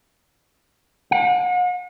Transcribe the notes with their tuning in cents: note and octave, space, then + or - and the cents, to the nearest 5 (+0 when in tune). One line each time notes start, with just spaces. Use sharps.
F#5 -40